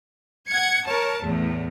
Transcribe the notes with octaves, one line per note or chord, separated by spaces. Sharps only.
F#5 G#6 C#7
A#4 C#5 A5
E2 A2